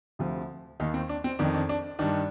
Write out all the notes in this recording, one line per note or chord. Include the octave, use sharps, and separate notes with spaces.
D2 C3 F3
D#2 D#3 D#4
C4
D4
C4
F2 D#3 D4
D4
D4
G2 D#3 D4